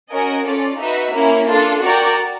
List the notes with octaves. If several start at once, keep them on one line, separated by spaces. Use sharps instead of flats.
C#4 F#4 A#4 D#5 G#5
C#4 F4 A4 D5
D#4 F#4 B4 E5
A#3 C#4 E4
D4 F4 A4
F#4 A#4 D5 G5